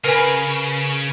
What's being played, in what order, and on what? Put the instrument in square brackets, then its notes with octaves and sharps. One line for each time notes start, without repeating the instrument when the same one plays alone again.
[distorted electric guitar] C#3 [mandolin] A#4 B4 G#5